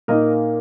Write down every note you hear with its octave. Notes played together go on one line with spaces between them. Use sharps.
A#2 A#3 D#4 A#4 D#5